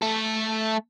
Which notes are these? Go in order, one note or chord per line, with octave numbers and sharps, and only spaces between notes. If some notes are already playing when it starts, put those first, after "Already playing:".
A3 A4